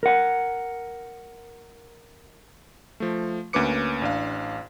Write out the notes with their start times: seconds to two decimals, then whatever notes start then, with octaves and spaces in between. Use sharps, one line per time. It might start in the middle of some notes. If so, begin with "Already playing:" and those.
0.03 A#4 F#5
3.00 F3 A3
3.53 D2 A#3 C#4 B4 D6 C#7
4.02 A1 D4 F5